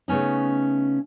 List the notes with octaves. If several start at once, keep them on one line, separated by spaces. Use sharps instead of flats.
C#3 A3 B3 C#4 D#4